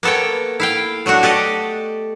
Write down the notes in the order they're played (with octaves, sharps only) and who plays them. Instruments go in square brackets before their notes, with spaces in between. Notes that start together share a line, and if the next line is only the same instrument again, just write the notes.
[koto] A#3 B3 A4 C#5 G5
E4 F5 G5
F#3 A3 D4 F#4
G4 A4 D5 D#5